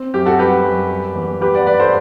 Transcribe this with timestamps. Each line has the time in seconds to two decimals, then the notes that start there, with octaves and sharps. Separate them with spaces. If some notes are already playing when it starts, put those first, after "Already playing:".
Already playing: C4
0.14 F#2 G4
0.26 F#4 A4
0.39 G3 G4 B4
0.65 F#2
0.90 G3
1.16 E2
1.41 G3 G4 B4
1.54 D5 F#5
1.66 G2 B4 D5
1.80 A4 C5